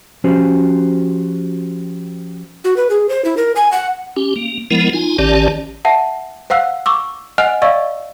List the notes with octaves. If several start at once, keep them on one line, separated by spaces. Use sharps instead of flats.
F3 C#4 F#4 G4 C5
F#4
B4
G#4
C5
E4
A#4
G#5
F#5
C#4 G4
A#3
F3 G#3 B3 E4 A#4
D#4 F4 G#5
A1 D#3 C#4 G4 D5 A5
E5 F#5 A5
C5 F5 F#5 E6 F#6
C#6 D6 E6
D#5 F#5 G#5 F6 F#6 F7
D5 D#5 F5 C#6 E6